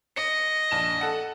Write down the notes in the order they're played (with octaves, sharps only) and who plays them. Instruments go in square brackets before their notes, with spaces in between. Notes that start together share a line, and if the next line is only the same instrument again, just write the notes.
[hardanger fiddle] D#5 [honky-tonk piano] C#7
[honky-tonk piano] A#1 A5 E7
A4 F#5